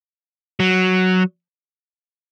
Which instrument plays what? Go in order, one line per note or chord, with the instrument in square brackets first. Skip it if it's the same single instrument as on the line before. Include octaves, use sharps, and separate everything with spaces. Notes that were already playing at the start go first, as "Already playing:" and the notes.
[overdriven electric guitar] F#3